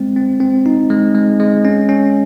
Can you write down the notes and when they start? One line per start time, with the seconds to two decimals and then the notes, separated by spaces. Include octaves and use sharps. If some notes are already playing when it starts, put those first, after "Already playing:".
Already playing: G#3 C4
0.16 C4
0.40 C4
0.66 D#4
0.90 G#3
1.15 G#3
1.40 G#3
1.65 C#4
1.89 C#4